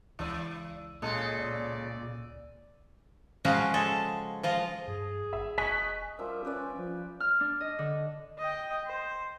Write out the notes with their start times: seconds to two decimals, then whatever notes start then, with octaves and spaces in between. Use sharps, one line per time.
0.19 C#2 E3 D5 E6 D#7
1.02 A#2 C#3 G#3 A4
1.38 D5
3.45 C#3 F3 G#3 C#4 F#4 F5
3.74 G#3 A4
4.43 F3 F4 D#5
4.87 G2 G#4
5.33 G#1 E5
5.58 F1 D#5 G#5 C#6 F#6 B6
6.19 F3 G3 A#4 E5
6.45 C#4 G4 B4 D5
6.77 F3
7.20 F6
7.40 D4
7.61 D#5
7.79 D3
8.38 D#5 G5
8.87 C5